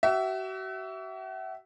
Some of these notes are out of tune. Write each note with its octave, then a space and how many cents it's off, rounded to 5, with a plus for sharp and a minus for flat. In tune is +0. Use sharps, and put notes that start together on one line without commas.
F#4 +40 E5 +0